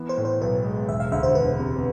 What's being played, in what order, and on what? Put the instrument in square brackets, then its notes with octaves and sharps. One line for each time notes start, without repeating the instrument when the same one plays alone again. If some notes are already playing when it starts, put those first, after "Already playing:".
Already playing: [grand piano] E3 B3
[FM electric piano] C5
[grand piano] A2
[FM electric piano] C5
[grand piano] B1 [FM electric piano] B4
[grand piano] G#3
[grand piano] E1 [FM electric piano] E5
[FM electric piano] F5
[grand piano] D2 [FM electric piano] E5
[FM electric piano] C5
[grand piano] E1 [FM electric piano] B4
[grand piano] C3